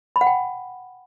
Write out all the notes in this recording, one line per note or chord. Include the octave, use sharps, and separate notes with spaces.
B5
F#5
G5